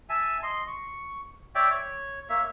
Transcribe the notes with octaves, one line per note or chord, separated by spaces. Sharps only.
E5 G#5 A5
D#5 C6
C#6
C#5 D5 E5 G5
C#5
A#3 C#5 E5